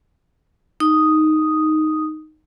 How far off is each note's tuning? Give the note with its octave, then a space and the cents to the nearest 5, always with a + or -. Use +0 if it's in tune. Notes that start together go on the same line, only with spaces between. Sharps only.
D#4 +0 D#6 +0